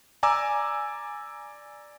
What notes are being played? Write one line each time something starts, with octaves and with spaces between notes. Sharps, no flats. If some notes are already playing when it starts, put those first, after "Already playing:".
D5 G#5 A#5 D6 E6